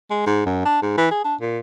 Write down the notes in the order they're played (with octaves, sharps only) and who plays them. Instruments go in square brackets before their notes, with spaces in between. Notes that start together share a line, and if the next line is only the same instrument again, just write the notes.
[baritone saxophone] G#3
G#2
F#2
D4
G#2
E3
G#4
D4
A#2